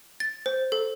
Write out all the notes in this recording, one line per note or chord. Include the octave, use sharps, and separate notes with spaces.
A6
C5
A4